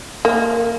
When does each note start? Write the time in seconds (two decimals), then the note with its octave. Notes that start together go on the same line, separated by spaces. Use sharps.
0.25 A#3